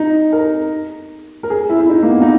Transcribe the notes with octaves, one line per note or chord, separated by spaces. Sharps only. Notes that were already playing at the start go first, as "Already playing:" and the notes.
Already playing: D#4
A#4
A#4
G#4
E4
E4
D#4
A#3
B3
D#4